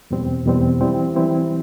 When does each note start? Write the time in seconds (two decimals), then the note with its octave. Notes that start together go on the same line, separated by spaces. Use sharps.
0.11 E2 B2 G3 C4
0.45 E2 B2 G3 C4
0.81 E3 G3 C4 E4
1.16 E3 G3 C4 E4